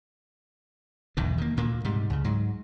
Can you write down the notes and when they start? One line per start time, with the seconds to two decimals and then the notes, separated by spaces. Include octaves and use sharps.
1.17 B1 E2 G#2 D#3
1.38 D#3 A#3
1.57 D2 A#2 A#3
1.85 G#2 C3 G3
2.10 C#2 C#3
2.24 G#2 F#3